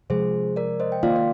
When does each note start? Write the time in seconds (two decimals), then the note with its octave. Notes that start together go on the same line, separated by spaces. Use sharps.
0.10 C3 F3 G#3 G#4 C5
0.56 A#4 D5
0.80 C5 D#5
0.92 G5
1.03 D#3 A#3 F4 D5 F5
1.16 D5